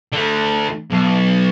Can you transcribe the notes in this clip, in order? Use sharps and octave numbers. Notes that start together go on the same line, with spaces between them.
D3 A3
B1